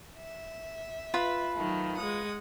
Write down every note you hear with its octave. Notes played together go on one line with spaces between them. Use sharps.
E5
F4 B4 B5
D#3 F#3 A3
G#3 F#5 D#6